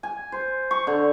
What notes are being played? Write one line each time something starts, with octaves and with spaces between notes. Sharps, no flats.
G#5
C5
C#6
D3